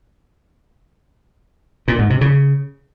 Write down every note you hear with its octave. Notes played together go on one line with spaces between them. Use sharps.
A#2
G#2
C3
C#3